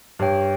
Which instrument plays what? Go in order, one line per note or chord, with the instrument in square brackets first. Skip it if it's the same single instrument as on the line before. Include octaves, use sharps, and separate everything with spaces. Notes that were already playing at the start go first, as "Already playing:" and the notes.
[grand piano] G2 [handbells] G4 C#5 G5